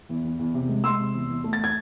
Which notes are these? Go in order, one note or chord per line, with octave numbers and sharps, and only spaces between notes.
E2
E2
E2
C3
G#3
G#3 C6 E6
C3
E2
E2
A3
A6
G#6